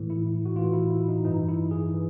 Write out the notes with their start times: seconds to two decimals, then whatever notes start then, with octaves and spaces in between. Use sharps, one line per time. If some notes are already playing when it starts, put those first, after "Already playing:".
Already playing: A2 E3
0.10 E4
0.45 F#4
0.55 A2 E3 F4
0.73 E4
0.91 E4
1.08 D#4
1.25 G2 E3 D#4
1.49 E4
1.71 G#4
1.94 E3